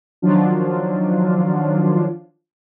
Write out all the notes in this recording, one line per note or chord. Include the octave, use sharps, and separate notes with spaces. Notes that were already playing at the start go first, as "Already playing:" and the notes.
D#3 F3 F#3 D4 F4